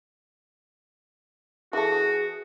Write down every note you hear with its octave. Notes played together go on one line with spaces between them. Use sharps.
E3 F#4 G#4 A4